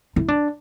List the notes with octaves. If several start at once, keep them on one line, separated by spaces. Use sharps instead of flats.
E4
D4